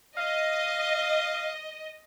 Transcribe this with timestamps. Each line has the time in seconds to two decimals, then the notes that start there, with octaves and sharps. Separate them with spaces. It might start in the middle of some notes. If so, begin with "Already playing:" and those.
0.17 D#5 F5